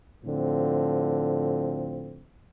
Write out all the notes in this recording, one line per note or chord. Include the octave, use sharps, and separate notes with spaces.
A2 D3 F3 C4